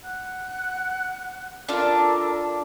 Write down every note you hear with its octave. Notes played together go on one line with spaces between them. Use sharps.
F#5 F#6
D4 F4 A4 A#4 D5